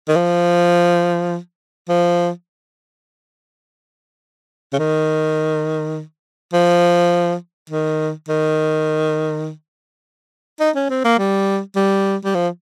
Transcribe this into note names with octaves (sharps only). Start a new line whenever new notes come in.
D#3
F3
F3
C#3
D#3
F3
D#3
D#3
D#4
C#4
C4
A#3
G3
G3
G3
F3